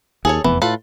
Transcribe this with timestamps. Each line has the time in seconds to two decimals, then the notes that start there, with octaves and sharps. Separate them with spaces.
0.25 D#2 G#4 A4 C#5
0.44 F1 E2 E3 B3
0.62 A2 F4 A4 B4